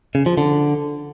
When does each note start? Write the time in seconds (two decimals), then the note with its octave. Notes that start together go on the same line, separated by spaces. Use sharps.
0.15 C#3
0.26 F3
0.38 D3